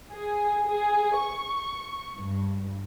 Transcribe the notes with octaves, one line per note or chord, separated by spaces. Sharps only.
G#4
G#4
C#6
G2